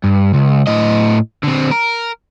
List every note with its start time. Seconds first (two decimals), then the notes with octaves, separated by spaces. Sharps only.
0.04 G2
0.34 C#2
0.67 A2 D#5
1.44 D3 C4
1.72 A#4